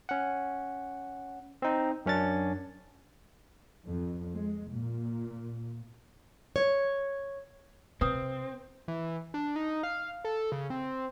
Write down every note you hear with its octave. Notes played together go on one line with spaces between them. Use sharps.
C#4 F#5
C4 D#4
F#2 C#4 D4 A6
F2
G#3
A#2
C#5
C3 C4 B4 D#6
E3
D4
D#4
F5
A4
C#3
C4